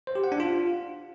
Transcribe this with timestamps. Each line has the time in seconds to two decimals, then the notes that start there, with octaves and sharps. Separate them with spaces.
0.07 C5
0.15 G4
0.24 F#5
0.32 D4
0.40 F4